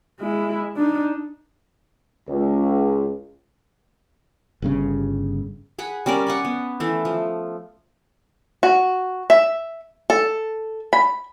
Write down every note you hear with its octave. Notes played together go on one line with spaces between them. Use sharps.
G#3 E4
D4 D#4
C#2
G1 G2 C#3
G#4 F#5 B5
G3 C#4 A#4 D5
F#5 G#5 B5
B3
E3 A3
F3
F#4
E5
A4
B5